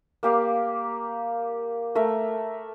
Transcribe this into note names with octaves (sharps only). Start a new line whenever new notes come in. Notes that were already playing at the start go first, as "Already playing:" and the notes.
A#3 G4 F5
A3 A#4 E5